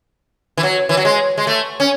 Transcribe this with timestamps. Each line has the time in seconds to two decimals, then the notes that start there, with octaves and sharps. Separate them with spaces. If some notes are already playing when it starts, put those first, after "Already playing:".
0.57 E3
0.63 F#3
0.89 E3
0.97 F#3
1.05 G#3
1.37 G#3
1.47 A3
1.80 C#4